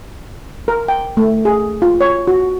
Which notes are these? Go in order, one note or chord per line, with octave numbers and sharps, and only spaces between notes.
A#4
G5
A3
G#4
F4
C#5
F#4